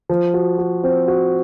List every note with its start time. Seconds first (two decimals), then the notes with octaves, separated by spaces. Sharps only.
0.10 F3
0.34 F#4
0.58 F#4
0.84 C4
1.08 F#4